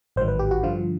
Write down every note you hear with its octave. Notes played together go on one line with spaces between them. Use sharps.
A1 G#2 D#3 F#3 C5
B4
G4
F#4
G2 D3 F3 F4